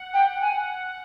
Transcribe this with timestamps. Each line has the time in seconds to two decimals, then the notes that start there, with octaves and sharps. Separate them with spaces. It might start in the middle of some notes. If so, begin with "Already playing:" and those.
Already playing: F#5
0.13 G5
0.41 G#5